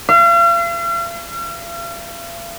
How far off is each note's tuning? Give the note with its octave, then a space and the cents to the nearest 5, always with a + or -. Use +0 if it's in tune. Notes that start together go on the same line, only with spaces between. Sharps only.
F5 -45